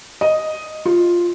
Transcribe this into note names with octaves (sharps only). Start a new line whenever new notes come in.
D#5
F4